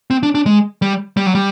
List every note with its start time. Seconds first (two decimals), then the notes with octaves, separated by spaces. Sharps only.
0.10 C4
0.23 D4
0.35 D4
0.46 G#3
0.82 G3
1.17 G3
1.26 F#3
1.35 G3